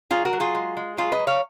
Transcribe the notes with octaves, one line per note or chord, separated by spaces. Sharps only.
F#3 F4 G#4
F#4 A#4
F#3
F4 G#4
G#3
G#3
F#3 F4 G#4
B4 D#5
F#3
C#5 F5